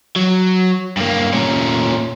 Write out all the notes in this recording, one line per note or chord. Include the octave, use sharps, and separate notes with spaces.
F#3
G2 A#3
A#2 C#4